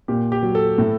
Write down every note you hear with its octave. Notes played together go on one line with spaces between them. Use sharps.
A#2 G4
G4
F#3
A4
A2